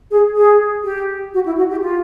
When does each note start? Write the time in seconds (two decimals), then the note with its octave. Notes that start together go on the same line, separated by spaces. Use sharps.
0.11 G#4
0.36 G#4
0.84 G4
1.34 F#4
1.46 E4
1.58 F#4
1.70 G4
1.82 F4